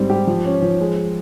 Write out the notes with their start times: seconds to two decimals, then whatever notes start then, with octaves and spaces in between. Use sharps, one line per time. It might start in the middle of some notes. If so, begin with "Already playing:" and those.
Already playing: G#2 G3 C4
0.10 G4
0.27 F3
0.45 C#4
0.62 F3
0.81 G#3